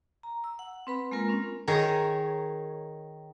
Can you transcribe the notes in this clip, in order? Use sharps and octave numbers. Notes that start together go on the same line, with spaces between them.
A#5
E6
F#5
C4 B4 B5
G#3 A#3 F4 A#4
C4 C#4
D#3 G#4 A#4 C#5